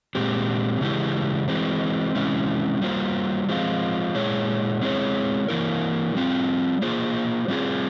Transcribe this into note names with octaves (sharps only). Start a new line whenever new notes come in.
A#2 G#3 C4 G4
C#3 E3 G#3 E4 G4
E3 G#3 C4
C3 E3 G#3 C#4 E4
G3 A#3 F4 C5
F3 G#3 C4 F4
A#2 G#3 E4 G#4 C#5
G#3 C4 E4 G#4 C#5
E3 A#3 E4 A#4
G3 C4 F4
A#3 F4 G#4 C5
G3 C4 F4 G#4